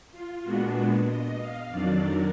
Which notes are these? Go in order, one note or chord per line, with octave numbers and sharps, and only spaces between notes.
F4
A#2 G#3 B3 D4 F#4
D#5
F5
F2 D#3 F#3 D4 D5
A#4